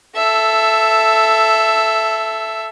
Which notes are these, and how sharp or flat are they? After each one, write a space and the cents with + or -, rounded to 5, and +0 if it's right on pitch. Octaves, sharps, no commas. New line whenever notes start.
A4 -5 E5 +10